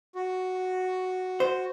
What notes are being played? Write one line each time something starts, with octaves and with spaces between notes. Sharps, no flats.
F#4
C5